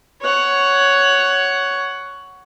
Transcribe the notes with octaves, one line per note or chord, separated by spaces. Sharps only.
C#5 F#5